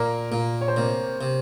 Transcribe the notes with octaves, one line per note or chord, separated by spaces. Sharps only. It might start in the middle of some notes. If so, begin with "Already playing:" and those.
Already playing: A#2 A#3 A#4
A#2 A#3 A#4
C#5
C5
C3 A#3 A#4
C3